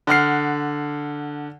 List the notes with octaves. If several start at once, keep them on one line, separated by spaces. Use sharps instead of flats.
D3 F#5 F6 C7